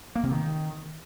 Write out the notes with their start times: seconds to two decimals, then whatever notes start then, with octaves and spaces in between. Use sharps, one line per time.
0.15 A#3
0.23 C3
0.31 D#3